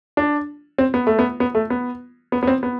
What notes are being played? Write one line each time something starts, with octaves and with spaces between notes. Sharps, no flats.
D4
C4
B3
A3
B3
B3
A3
B3
B3
B3
C4
B3